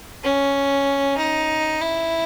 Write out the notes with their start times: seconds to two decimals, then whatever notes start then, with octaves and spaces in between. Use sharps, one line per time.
0.23 C#4
1.17 D#4
1.81 E4